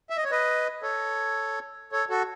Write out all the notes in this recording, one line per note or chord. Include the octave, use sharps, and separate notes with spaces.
E5
D#5
C#5
B4 D#5
A4 C#5
A4 C#5
F#4 A4